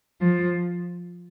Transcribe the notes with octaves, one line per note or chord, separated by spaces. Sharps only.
F3